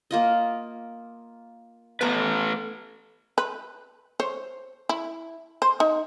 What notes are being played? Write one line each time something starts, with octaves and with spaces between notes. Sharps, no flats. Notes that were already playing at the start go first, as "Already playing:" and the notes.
A#3 F4 D#5
A3 B3 A4 B4 A#5 D6
B4
C5 C#5
E4
C5
D#4